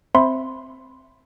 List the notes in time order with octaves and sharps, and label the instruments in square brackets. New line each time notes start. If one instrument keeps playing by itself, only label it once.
[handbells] C4 C5 E5 B5 C6